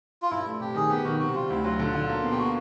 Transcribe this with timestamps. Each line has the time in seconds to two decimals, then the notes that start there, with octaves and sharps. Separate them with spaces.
0.22 F4
0.31 G2 E4
0.46 A3
0.60 C3 G4
0.75 D#3 G#4
0.90 B3 G4
1.05 D#3 F#4
1.20 C3 F#4
1.34 G3 F4
1.49 D2 E4
1.64 F#3 F4
1.79 D3
1.95 D3
2.09 A#3
2.23 B2
2.31 G4
2.38 F#4